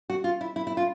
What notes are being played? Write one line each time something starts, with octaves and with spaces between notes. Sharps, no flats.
F#4
F4
E4
E4
E4
F4